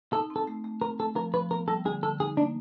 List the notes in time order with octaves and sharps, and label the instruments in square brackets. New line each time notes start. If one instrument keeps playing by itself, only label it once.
[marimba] D#4 [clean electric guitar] A4
[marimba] C4
[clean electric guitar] A4
[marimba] A3
A3
[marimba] C4 [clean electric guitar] A#4
[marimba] A3 [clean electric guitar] A4
[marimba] F3 [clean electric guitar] A#4
[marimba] F3 [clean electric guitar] B4
[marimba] B3 [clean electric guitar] A#4
[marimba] G3 [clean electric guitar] A4
[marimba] D3 [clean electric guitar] G#4
[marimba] D3 [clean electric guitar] A4
[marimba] D#4 [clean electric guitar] G#4
[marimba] A#3 [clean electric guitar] D4